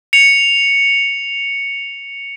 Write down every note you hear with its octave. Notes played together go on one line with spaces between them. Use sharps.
C#7 F7